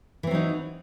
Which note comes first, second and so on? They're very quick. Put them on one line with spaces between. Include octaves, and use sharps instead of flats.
E3 C4 F#3 D#4